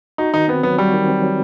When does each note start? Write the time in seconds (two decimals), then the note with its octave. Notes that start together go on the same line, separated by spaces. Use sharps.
0.18 D#4 F#4
0.34 D#3 D#4
0.48 B3 C4
0.63 F#3 B3
0.78 G3 F#4
0.93 D#3
1.08 C4
1.22 F#3